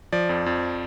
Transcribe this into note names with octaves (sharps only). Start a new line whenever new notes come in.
F3 D5
F2
F2